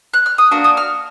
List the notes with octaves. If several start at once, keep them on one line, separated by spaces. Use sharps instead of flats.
F#6
F6
D#6
A#3 D4 F#4
D#6
F6